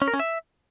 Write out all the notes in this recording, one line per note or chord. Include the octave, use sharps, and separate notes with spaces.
C#4
A#4
C#4
E5